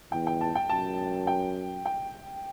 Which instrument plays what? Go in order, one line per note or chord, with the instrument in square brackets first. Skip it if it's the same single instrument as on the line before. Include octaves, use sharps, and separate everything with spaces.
[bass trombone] E2 [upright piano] G5
[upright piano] G5
A5
G5
[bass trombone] F#2 [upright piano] A5
[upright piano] G5
G5